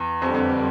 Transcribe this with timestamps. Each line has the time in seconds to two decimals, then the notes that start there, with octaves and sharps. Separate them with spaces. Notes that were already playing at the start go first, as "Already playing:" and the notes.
Already playing: E2
0.22 F2 D3 G3 C4 G4 B4
0.35 F2